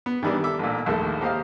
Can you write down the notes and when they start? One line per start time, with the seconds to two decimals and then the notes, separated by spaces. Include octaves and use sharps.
0.06 B3
0.23 D#3 E3 G3 B3 D4
0.44 A4 E5 D6
0.59 A1 A#2
0.86 A#1 D#2 G#3 A3 A4
1.21 A#3 G4 C5 D#5 F5